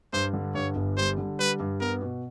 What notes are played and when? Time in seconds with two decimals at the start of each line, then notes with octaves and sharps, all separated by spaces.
0.13 G2 C5
0.33 D3
0.55 G2 C#5
0.76 G1
0.97 G3 C5
1.18 D3
1.39 G3 B4
1.60 G2
1.80 B3 A#4
2.02 B2